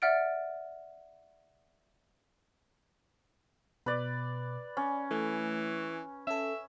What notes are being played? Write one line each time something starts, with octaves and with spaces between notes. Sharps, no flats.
D5 E5 F#5 F6 A6 D7
B2 B4 D5
C#4 D5
E3 A3
C#4 A4 E5